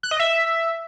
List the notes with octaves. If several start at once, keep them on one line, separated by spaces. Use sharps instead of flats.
F#6
D#5
E5